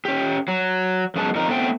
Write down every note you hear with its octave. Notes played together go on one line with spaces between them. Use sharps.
C#4 G4
F#3
F#2 F#3 G#3 B3 A5
F2 D#4 A#4
A3 B3 C4 D#5 G5